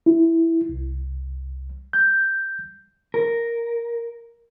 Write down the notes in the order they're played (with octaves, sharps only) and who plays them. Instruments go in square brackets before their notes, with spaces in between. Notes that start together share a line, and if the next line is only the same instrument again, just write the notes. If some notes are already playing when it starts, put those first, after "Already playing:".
[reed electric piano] E4
C2
G6
[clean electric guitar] A#4